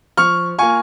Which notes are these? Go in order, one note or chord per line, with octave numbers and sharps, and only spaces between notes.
F3 C#6 F6
A#3 F4 G#5 C#6